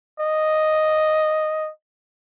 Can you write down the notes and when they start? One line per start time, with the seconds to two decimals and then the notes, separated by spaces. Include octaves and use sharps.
0.20 D#5